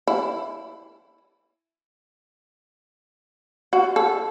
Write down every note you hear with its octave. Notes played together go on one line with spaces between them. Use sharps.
E4
F#4
A4